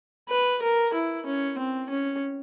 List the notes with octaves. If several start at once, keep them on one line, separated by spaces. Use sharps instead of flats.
B4
A#4
E4
C#4
C4
C#4